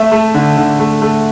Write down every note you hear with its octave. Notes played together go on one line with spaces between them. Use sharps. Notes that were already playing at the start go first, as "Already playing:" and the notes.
Already playing: A3 E5
A3
D3
D3
A3
A3